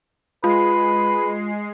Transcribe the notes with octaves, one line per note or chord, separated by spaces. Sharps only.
G#3 F4 B4 C7